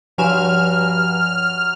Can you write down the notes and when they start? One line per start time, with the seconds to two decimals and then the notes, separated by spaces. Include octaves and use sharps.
0.18 G2 F3 F#3 G#5 F6 E7